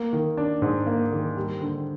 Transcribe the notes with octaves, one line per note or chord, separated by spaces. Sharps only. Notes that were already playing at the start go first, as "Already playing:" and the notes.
Already playing: A#3
D#3
D4
G#2
A#3
D#3
G3
D3